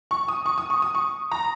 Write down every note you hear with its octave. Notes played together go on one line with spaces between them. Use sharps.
C#6
D#6
C#6
D#6
C#6
D#6
C#6
A#5